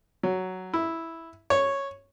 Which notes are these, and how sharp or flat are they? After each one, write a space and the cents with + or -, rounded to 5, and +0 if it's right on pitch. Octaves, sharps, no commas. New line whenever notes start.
F#3 +5
E4 -5
C#5 -5